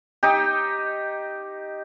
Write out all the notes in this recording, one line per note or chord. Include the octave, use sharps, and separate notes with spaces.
D#4 G4